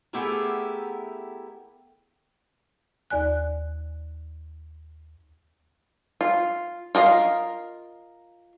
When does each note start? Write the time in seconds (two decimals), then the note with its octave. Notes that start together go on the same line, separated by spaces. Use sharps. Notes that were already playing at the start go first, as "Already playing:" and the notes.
0.13 A3 B3 E4 G4 G#4 A#4
3.10 D#2 D5 G#5 F#6
6.21 F4
6.95 F4 A#4 D#5 F5